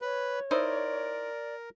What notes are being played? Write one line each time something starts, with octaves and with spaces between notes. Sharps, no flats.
B4 C#5
D#4 E4 A#4 C5 D5